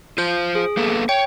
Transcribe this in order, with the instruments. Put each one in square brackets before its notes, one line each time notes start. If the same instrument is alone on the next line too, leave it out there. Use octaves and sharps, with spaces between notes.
[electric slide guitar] F4 C5 [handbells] G6
[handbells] G#4
[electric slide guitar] A#3 B3 A4
[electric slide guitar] C#5 [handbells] G5